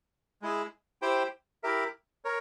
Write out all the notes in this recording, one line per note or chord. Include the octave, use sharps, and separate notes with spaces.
G#3 E4 G#4
E4 G4 C5 G5
E4 G4 A#4 E5
A#4 C#5